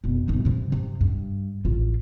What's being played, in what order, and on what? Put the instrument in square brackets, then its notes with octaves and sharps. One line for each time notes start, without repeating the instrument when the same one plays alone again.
[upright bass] F1 B2
G1 D#4
G2 C3
C3
G2
A1 F4